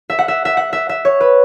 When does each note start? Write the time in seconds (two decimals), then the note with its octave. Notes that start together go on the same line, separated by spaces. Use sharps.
0.10 E5
0.19 F#5
0.28 E5
0.45 E5
0.57 F#5
0.73 E5
0.89 E5
1.05 C#5
1.21 B4